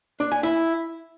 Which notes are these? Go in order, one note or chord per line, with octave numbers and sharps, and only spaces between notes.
D4
G#5
E4